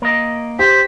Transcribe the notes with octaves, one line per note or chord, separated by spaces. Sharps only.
A#3 D#5
G4 C5 B6